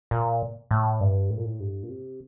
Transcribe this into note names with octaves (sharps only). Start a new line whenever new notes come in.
A#2
A2
G2
A2
A#2
A2
G2
A#2
C3